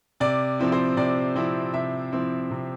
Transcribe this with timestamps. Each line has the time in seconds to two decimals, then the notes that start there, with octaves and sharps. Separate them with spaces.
0.20 C3 D5
0.59 F3 C4 E4
0.72 C5
0.97 C3 D5
1.35 F3 C4 E4
1.73 C3 E5
2.13 F3 C4 E4
2.51 C3